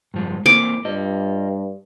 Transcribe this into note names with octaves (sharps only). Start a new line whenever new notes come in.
G2 F3 G#3
A#3 C4 E4 D6
G2 F4 D#5